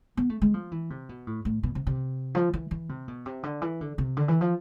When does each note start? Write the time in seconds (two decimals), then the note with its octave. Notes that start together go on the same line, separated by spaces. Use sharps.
0.17 B3
0.30 A3
0.42 G#3
0.54 F3
0.72 E3
0.90 C3
1.09 B2
1.27 A2
1.45 A2
1.63 B2
1.75 C3
1.87 C3
2.35 F3
2.54 E3
2.71 E3
2.89 C3
3.08 B2
3.26 C3
3.43 D3
3.62 E3
3.81 D3
3.98 C3
4.17 D3
4.28 E3
4.41 F3